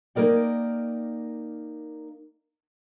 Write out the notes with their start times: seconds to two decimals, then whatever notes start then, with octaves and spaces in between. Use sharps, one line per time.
0.15 A#3 D#4 A#4 D5 G5